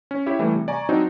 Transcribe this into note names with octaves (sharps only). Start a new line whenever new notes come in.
C#4
E4 G4 C#5 E5
E3 G3 A3 E4
C3
D5 G#5 A#5 C#6
F#3 C4 D4 D#4 F#4